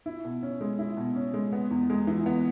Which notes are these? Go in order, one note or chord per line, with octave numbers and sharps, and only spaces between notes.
E4
B2
C#4
G#3
E4
B2
C#4
G#3
B3
E2
G#3
E3
B3